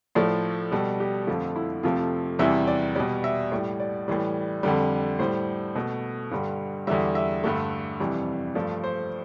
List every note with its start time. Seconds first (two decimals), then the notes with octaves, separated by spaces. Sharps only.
0.15 A2 F3 A3 D5
0.72 B2 G3 A4
1.00 G4
1.27 F2 D3 F3 A3 F4
1.56 E4
1.83 F2 C3 F3 A3 F4
2.39 E2 C3 E3 G3 E5
2.67 D5
2.95 B2 G3 D5
3.24 E5
3.52 A2 G3 D5
3.80 D5
4.08 A2 E3 G3
4.63 F2 D3 G3
5.19 A2 G3 C5
5.75 B2 A3
6.31 G2 D3 G3
6.87 E2 D3 G3 E5
7.15 E5
7.44 G2 D3 A3
8.00 F2 C3 E3 G3
8.55 G2 F3 A3 D5
8.84 C5